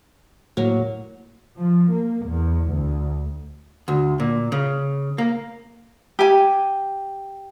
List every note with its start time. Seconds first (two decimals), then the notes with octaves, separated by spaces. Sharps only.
0.57 A2 F#3 A#3
1.57 F3
1.90 A#3
2.27 E2
2.65 D2
3.88 D2
4.20 A#2
4.52 C#3
5.18 A#3
6.19 G4 G#5